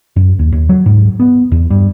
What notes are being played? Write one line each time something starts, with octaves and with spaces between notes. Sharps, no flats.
F#2
D#2
D#2
F#3
G#2
B3
E2
G2